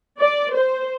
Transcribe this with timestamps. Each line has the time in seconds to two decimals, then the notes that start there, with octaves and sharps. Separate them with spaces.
0.19 D5
0.54 C5